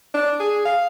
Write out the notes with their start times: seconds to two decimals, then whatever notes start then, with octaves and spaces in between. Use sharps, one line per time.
0.14 D4
0.40 G#4
0.65 F5